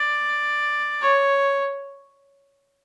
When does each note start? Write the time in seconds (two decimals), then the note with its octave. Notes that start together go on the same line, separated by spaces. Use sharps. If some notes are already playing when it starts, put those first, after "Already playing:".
Already playing: D5
1.02 C#5